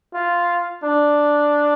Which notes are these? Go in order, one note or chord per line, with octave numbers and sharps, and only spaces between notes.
F4
D4